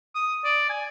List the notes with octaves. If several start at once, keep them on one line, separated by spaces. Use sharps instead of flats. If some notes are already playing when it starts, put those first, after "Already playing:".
D#6
D5
G#5